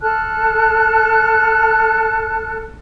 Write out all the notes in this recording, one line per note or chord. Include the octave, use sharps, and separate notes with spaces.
A4 A5 F6 F#6